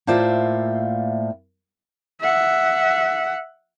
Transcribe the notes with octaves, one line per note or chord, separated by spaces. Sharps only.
A2 A#3 F4 C5 D5 E5
E5 F#5